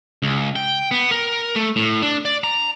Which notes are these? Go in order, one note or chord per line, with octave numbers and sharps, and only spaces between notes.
C#2
G5
B3
A#4
A3
A2
D4
D5
A#5